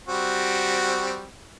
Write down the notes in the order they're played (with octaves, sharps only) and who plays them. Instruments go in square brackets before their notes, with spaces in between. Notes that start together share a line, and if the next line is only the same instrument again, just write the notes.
[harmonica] G3 C4 F#4